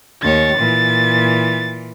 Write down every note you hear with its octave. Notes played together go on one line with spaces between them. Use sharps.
D#2 C#5 A6
A#2 E3